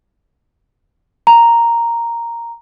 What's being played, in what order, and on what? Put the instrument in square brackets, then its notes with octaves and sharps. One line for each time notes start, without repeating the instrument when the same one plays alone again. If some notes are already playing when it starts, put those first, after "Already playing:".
[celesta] A#5